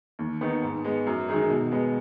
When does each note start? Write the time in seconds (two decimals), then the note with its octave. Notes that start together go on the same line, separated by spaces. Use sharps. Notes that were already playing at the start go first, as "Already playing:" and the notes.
0.19 D#2
0.41 D#3 B3 D#4
0.62 G#2
0.84 G#3 B3
1.07 F#2
1.28 D#3 G#3 D#4 G#4
1.50 B2
1.72 G#3 B3